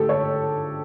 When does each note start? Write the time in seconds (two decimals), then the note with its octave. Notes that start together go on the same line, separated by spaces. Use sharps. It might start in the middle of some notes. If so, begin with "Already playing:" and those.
Already playing: D3 A3 G4 A4
0.09 C#5